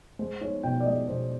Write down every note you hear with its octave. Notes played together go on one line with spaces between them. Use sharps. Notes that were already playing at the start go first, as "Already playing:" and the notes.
G#3 C5
D#4 C#5
B2 G5
D5
G#3 D#5
B2 C5